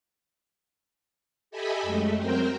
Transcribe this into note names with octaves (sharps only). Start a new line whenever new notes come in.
G4 A4 D#5 E5 G#5 B5
F#2 G#3 A3
F#3 C4 A#4 C5 G5